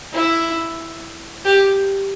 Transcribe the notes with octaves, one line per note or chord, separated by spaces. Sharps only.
E4
G4